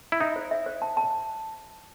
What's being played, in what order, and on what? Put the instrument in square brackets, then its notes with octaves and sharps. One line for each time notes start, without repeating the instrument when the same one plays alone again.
[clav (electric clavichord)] E4
[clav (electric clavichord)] D#4 [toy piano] E5
[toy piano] C5
E5
C5
A5
A5